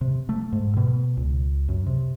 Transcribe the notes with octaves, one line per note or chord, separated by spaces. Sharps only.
C3
A3
G#2
B2
C#2
F#2
C3